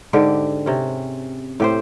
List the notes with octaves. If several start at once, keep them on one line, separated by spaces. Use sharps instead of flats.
G#2 D3 G4
C3 C#4
A2 G4 C5